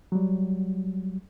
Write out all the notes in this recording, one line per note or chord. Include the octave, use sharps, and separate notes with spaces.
F#3 G3